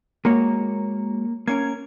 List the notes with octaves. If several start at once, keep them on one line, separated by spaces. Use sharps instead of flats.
G#3 A#3 F#4 C#5
A#3 C#4 A#4 G#6